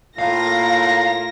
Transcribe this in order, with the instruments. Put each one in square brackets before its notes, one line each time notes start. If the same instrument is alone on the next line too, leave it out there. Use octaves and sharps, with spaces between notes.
[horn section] A2 [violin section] A#3 A#6 [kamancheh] F4 A#5 [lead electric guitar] F5